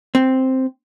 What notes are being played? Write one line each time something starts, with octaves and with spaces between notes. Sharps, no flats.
C4